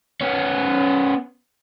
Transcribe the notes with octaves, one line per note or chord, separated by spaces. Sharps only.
B3 C#4